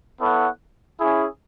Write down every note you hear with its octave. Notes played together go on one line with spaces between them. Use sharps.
B3 E4 A4 C#5 F#5
C#4 E4 G#4